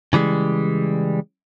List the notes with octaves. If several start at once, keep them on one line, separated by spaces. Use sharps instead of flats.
C#3 E3 G3 G#3